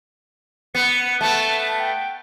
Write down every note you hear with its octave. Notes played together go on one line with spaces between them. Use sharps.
B3 C#7
A3 B3 A5
G5